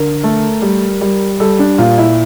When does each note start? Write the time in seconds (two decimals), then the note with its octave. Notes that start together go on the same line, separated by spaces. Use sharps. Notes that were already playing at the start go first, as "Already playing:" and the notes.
Already playing: D3 A#4
0.24 A3
0.62 G3
1.01 G3
1.40 G3 A4
1.59 D4
1.78 A#2 F4
1.98 E4